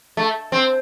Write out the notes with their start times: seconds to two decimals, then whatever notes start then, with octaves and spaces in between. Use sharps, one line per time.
0.17 A3
0.52 C4